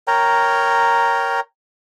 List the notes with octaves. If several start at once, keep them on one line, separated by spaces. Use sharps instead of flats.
A#4 C#5 G5 A#5